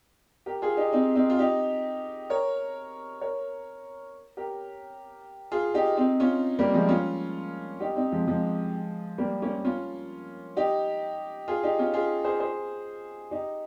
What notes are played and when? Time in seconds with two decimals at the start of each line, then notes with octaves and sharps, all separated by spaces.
0.46 G4 A#4
0.62 F4 G#4
0.77 D#4 G4
0.92 C4 D#4
1.16 C4 D#4
1.30 F4
1.38 D#4 G4
2.30 A#4 C#5
3.21 A#4 C#5
4.37 G4 A#4
5.51 F4 G#4
5.74 D#4 G4
5.97 C4 D#4
6.20 C#4 F4
6.59 G3 A#3
6.74 F3 G#3
6.89 C#4 F4
7.80 D#4 G4
7.96 C4 D#4
8.12 F3 G#3
8.27 F3 G#3
9.18 G3 A#3
9.42 A#3 C#4
9.65 C#4 F4
10.57 D#4 G4
11.48 F4 G#4
11.63 D#4 G4
11.79 C#4 F4
11.94 F4 G#4
12.24 G#4 C5
12.40 G#4 C5
13.31 D#4 G4